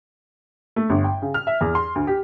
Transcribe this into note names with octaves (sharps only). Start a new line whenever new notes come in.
A3
G1
G5
C#3
F6
E5
E2
C6
D2
G4